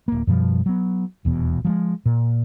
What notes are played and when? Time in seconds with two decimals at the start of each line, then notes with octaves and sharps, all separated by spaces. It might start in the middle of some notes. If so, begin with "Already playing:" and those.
0.08 D1 A#3
0.27 F#2 B2 F3 G3
0.66 F#3 B3
1.25 D#1 E2 B2
1.65 F3 F#3 G#3
2.05 A#2